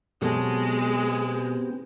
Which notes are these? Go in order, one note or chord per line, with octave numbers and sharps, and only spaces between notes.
B2 F#3 G#3 B3 C4 G4 A4